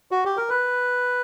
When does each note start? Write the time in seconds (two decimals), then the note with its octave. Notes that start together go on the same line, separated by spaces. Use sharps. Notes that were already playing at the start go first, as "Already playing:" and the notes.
0.11 F#4
0.25 G4
0.37 A#4
0.50 B4